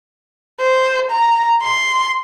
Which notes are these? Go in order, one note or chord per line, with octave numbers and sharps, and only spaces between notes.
C5
A#5
C6